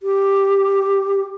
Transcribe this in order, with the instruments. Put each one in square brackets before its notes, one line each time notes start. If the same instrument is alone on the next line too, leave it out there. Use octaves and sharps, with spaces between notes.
[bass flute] G4